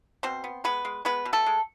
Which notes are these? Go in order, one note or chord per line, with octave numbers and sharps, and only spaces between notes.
B2 C4 C5
B3
G#3 B3 B4
G#3
G#3 B3 B4
B2
A3 A4
G#3